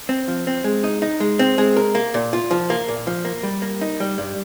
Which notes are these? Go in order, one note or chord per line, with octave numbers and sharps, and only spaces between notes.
C4
F3
C4
G#3
D#4
D#4
G#3
C4
G#3
A#4
A#3
A#2
F4
F3
A#3
A#2
F3
A#3
G3
A#3
D#4
G3
G2